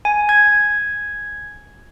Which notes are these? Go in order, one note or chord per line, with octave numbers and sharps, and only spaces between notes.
G#5
G#6